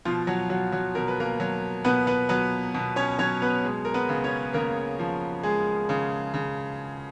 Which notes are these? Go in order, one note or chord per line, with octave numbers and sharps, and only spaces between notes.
B2 F3 F4
F#3 F#4
F#3 F#4
F#3 F#4
B2 A#4
B4
A#3 A#4
F#3
B2 B3 B4
B3 B4
F#3 B3 B4
B2
C#4 C#5
F#3 C#4 C#5
B3 B4
G#3
A#4
B3 B4
C#3
C#4 C#5
C#3 A#3 A#4
F3
G#3 G#4
C#3
C#3